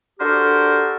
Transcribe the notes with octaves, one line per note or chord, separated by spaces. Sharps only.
D4 F#4 G4 A4 A#4 C5